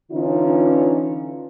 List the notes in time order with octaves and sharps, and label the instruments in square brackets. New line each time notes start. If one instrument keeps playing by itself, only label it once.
[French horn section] D3 E3 C#4 D#4 F4